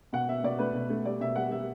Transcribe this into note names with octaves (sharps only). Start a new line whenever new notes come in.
B2 F#5
B2 E5
B2 D5
A3 B4
B2
A3
G3 D5
B2 E5
G3 F#5
G3 E5